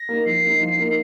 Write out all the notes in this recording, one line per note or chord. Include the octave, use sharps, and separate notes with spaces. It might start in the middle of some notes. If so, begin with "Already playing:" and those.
Already playing: A#6
A#3 D#4
F3 C7
A#3 D#4
F3
A#3 D#4